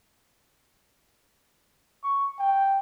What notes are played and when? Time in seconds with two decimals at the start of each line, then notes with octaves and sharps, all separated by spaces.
2.03 C#6
2.39 G5